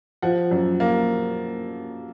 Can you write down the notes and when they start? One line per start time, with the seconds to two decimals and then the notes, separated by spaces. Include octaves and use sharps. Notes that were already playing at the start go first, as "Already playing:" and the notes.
0.22 F3 F#5
0.51 F#2
0.80 A#3